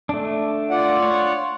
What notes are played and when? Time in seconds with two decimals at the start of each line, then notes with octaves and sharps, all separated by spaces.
0.09 A3 D4
0.70 F4 D5 F#5
1.02 C#5